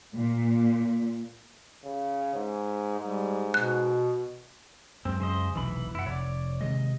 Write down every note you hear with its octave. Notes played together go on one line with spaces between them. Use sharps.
A#2
C#3
G#2
G#2 G3
B2 F#6
F#2 F#3 G#3 C4
C#3 C5 D#5
E1 B1 C3 E3 B5
F#2 E4 F#5
F1 C#5 D5
C3 D#3 G#3 D#5